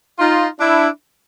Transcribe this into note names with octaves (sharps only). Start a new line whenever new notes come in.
D#4 F4
D4 E4